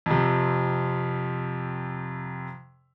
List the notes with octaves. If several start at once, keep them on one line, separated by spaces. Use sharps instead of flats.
F2 C3